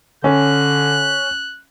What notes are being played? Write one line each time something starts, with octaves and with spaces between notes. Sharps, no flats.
D3 C#4 F#6